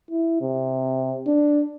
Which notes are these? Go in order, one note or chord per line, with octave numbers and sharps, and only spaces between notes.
E4
C3
D4